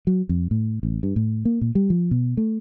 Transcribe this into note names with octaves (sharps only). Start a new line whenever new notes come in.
F#3
F2
A2
A1
G2
A2
A#3
A#2
G3
F3
B2
A3